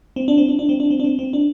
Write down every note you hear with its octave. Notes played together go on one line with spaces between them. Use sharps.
C4
D4
C4
D4
D4
C4
D4
C4
D4
C4
C4
D4